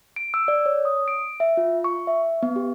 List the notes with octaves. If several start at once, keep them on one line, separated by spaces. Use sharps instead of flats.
D7
E6
D5
C#5
D#6
D7
E5
F4
C#6
E5
B3
G4